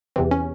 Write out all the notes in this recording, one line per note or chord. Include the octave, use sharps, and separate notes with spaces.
E2 C3 E3 C4
C#4